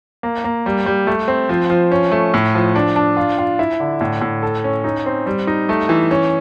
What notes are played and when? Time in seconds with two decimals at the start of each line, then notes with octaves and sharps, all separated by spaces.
0.23 A#3
0.44 A#3
0.66 G3
0.86 G3
1.07 A3
1.28 C4
1.49 F3
1.70 F3
1.92 C#4
2.12 A3
2.34 A2
2.54 F3
2.76 D4
2.96 D4
3.17 F4
3.38 F4
3.59 E4
3.80 D3
4.01 A2
4.21 A2
4.43 A4
4.64 C#4
4.84 D#4
5.06 C4
5.26 G3
5.47 D#4
5.69 A3
5.89 E3
6.11 C#4